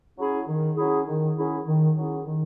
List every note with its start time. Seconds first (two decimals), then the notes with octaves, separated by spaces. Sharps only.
0.17 F#3 C#4 E4 G#4
0.47 D#3
0.76 F#3 C#4 E4 G#4
1.06 D#3
1.37 F#3 C#4 E4 G#4
1.66 D#3
1.95 F#3 C#4 E4 G#4
2.26 D#3